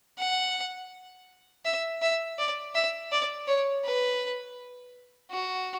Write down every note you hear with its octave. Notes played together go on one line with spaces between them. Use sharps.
F#5
E5
E5
D5
E5
D5
C#5
B4
F#4